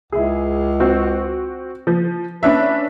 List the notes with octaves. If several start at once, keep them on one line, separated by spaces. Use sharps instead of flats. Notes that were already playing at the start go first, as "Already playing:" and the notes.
C#2 E4 G#4
C4 F#4
F3
C#4 D4 B4 E5